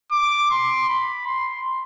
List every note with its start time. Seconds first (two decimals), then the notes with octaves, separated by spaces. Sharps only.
0.12 D6
0.51 C6
0.89 B5
1.27 C6